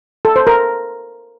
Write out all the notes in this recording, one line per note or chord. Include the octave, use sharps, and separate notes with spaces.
A4
C5
A#4